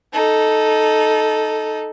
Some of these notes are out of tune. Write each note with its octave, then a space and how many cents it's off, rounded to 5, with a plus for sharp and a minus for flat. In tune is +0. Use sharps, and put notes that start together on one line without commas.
D#4 +0 A4 -10